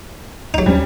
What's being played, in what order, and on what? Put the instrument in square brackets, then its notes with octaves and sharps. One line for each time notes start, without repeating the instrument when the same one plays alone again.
[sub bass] C2 [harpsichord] F#3 D#4
[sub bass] D#2 [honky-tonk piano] G3 C#4